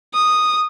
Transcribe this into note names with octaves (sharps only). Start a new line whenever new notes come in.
D#6